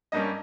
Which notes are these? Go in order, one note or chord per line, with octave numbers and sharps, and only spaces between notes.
G2 G3 A#3 C#4 D#5